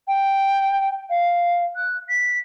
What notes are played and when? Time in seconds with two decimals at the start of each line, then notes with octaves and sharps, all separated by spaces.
0.08 G5
1.10 F5
1.76 F#6
2.09 B6